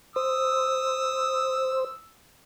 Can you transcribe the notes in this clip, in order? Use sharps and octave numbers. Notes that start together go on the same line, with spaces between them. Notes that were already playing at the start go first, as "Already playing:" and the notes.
C5 D#6 E6